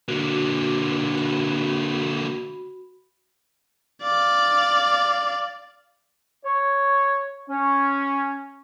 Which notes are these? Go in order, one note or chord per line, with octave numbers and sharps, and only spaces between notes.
D3 A#3 F#4
F#4 B5
D5 F5
C#5
C#4